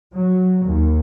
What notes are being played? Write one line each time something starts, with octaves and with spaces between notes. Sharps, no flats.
F#3
D#2